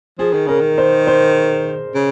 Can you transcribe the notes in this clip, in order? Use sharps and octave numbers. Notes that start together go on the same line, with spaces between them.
F3 G#4
D#3
C#3 A#4
D#3
C5
C5
C#3